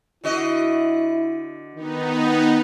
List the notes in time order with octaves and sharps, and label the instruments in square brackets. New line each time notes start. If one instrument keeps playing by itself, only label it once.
[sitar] D3 F#4 D#5 [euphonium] E4
[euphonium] D#3 [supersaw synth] B3 D#4